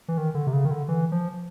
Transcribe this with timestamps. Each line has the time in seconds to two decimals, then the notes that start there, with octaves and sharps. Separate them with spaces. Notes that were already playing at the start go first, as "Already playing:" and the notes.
0.08 E3
0.18 D#3
0.35 D3
0.47 C3
0.53 C#3
0.65 D#3
0.71 D3
0.88 E3
1.12 F3